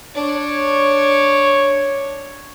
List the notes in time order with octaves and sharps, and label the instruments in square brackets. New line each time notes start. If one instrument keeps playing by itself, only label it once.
[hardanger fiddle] D4 [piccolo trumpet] C#5